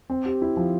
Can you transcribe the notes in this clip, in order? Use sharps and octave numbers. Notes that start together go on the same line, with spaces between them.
C4
G4
E4
F3